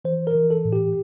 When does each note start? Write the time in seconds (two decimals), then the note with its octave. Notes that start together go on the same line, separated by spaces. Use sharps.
0.05 E3 C5
0.27 A#4
0.35 E3
0.50 A4
0.65 A2
0.73 G4